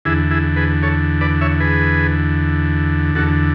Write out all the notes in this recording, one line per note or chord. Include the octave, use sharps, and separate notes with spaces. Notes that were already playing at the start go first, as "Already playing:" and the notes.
E2 D3 E4 G#4
E4 G#4
G#4 B4
A4 C#5
B4 D5
C#5 E5
G#4 B4
E2 D3 F#4 A4